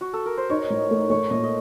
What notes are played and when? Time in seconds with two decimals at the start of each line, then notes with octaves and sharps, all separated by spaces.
0.01 F#4
0.13 A4
0.26 A#4
0.37 C5
0.50 D#4 C#5
0.70 A2
0.91 A3
1.10 A3 C#5
1.31 A#2 D#5
1.44 D#5